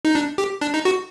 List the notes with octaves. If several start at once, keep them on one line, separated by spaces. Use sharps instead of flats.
D#4
D4
G4
D4
D#4
F#4